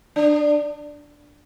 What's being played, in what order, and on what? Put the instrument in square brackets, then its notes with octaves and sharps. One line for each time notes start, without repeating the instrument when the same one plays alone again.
[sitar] D4